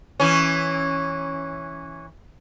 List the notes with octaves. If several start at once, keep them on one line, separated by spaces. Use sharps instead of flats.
E3 C#4